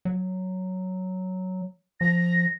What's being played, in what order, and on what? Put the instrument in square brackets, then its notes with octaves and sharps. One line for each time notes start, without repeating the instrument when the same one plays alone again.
[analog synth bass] F#3
[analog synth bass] F3 [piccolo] A#6